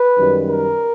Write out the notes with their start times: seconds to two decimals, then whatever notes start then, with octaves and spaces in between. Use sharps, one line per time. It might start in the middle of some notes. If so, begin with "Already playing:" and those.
Already playing: B4
0.18 F#2 D#3 G3
0.50 A#4